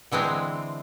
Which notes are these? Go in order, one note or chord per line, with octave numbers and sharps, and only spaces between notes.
D3 E3 G#3 C4